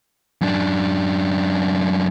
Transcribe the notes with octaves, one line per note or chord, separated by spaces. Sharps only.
F#2 D4